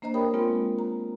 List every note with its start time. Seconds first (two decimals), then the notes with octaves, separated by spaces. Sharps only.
0.02 A#3 D4 C5 D#5 A#5
0.14 G4 A#4 C#5 G5 B5 D#6
0.34 G#3 B3 C4 F4 A#4
0.79 A#5